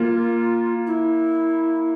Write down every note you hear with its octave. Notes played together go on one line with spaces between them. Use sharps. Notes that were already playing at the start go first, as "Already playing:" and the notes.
Already playing: A#3 F4
E4